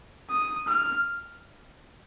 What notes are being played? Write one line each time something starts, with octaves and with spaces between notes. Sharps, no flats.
D#6
F6